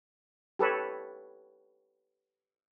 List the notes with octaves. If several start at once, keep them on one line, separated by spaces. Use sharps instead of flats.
G4 A4 B4 C#5